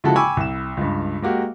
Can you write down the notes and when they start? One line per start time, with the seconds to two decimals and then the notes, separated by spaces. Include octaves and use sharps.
0.04 C#3 F3 G#3 E4 F#4 A4
0.16 G5 G#5 B5 C#6 D6 E6
0.37 C2 E7
0.77 C#2 G2
1.22 G#3 A#3 F#4 G4